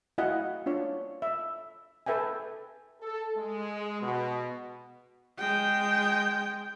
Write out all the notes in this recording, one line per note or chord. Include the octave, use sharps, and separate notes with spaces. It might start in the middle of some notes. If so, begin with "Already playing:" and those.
E4 F#4 D#5 F5 F#5
D4 F4 C#5
E5
A4 B4 E5 G5 G#5
A4
G#3
B2
G#3 G5